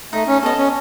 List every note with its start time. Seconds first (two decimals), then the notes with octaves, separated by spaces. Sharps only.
0.13 A3 D#4
0.28 C#4
0.43 B3 A4 D#5
0.58 C#4